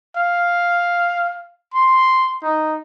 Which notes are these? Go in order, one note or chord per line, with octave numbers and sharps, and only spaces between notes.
F5
C6
D#4